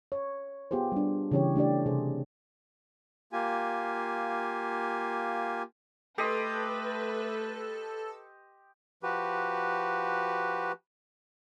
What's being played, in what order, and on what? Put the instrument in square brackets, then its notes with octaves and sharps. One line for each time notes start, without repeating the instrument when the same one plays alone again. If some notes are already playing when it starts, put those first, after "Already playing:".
[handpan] C#5
B3 F4 G4 G#4 C5
G3 D4
C#3 E3 C#4 G4 C#5
A3 D4 G4 D5
C3 G#4 C5
[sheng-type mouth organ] A#3 F4 G4 G#5
[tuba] A3 [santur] G4 D#5 C6 [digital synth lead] A4 [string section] B4
[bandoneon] F3 F#4 G4 B4